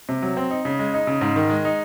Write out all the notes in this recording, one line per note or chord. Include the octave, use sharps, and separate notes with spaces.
C3
F#3
C4
D#4
C#3
G#3
D#4
C#3
G#2
D#3
G#3
D#4